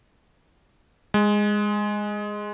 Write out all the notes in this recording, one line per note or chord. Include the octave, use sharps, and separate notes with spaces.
G#3